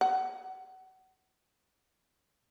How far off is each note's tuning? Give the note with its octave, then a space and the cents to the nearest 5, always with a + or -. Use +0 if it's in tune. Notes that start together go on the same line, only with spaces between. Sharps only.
F#5 +30